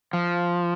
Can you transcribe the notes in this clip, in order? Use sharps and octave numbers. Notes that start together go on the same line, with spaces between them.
F3